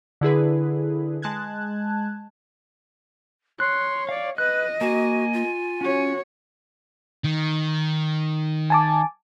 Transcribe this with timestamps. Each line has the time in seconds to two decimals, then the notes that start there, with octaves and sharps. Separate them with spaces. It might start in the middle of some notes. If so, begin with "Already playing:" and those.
0.21 D3 E4 G#4 B4
1.22 G#3 A5 F#6 G#6
3.60 C#5 C6 F#6
4.09 D5 F5
4.38 B4 D#5 F#6
4.81 A#3 F#4 G#5
5.34 F4
5.81 C#4 F#4 C#5
7.25 D#3
8.70 G#5 A5 D6